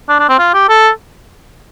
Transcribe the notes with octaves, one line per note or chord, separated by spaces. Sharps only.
D4
D4
C4
F4
G4
A4